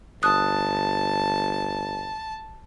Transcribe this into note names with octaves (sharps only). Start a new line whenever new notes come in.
G1 A5 D#6 F#6